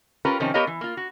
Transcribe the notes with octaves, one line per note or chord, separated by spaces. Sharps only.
C#4 F4 G4 A#4 B4
C3 D#3 F3 C4 C#4
B3 G4 A#4 C#5 D#5 F5
E3
A#3 F4
F#4